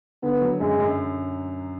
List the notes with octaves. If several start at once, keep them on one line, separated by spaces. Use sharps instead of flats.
D3 B3
F#3
F#2 G#3
F#2